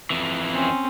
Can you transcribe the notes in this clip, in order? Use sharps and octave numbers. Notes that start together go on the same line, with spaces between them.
F2 E3
C4 C#4